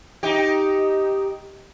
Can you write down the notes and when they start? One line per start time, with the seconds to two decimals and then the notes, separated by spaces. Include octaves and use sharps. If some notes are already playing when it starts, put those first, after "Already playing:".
0.23 D#4 G4